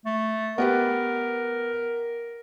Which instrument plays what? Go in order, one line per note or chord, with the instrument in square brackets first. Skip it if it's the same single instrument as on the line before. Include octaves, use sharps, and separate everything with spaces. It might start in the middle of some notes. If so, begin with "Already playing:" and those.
[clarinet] A3
[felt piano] B3 G4 B4 [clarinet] A#4